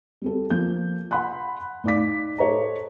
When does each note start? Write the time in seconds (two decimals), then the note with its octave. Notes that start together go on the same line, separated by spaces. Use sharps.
0.22 G3 C4 A4
0.50 F3 A#3 G6
1.11 F#5 G#5 B5 C6 F#6
1.84 A2 D#4 D5 F5 D6 B6
2.38 A4 C5 C#5 D#5 A#5